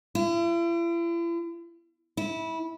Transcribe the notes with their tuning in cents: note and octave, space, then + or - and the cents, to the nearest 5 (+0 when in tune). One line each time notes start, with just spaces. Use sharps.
E4 +45
E4 -20